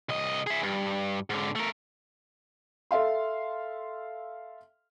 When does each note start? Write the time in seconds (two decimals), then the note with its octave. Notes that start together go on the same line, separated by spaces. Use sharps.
0.09 C2 D#5
0.47 G#4 E5
0.63 G2
1.30 G#2 D3
1.56 A3 A#4
2.91 A4 E5 F5 C6